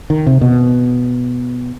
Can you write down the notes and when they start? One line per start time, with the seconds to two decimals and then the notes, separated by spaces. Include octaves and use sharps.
0.10 D#3
0.27 C3
0.41 B2